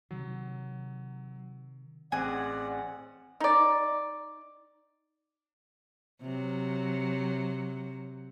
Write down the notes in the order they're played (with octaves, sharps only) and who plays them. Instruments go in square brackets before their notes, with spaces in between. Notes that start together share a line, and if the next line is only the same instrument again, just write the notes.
[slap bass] C3 D#3 [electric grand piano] F#3
[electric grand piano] A1 C4 F#6 [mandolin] G#4 [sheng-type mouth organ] D5 F#5
[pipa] D#4 D5
[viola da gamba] C3 F#3